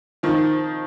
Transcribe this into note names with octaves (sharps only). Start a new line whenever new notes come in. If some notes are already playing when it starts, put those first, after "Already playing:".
D#3 F3